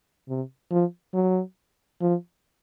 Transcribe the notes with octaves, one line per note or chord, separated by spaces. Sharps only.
C3
F3
F#3
F3